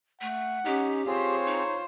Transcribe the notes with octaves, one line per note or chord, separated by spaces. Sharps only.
A3 F#5
C#4 D#4 G4
C4 F4 G#4 C5 C#5
D#4